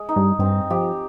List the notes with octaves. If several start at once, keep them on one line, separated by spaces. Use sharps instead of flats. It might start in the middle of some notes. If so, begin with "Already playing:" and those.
Already playing: G#3
D#4
G2
G2 C4
F3 G4